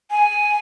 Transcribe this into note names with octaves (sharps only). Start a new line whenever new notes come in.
G#5